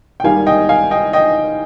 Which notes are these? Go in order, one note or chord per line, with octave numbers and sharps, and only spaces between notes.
G5
G#1 G#2 G3 A#3 F5 G#5
D#5 G5
F5 G#5
D#5 G5
D#5 G5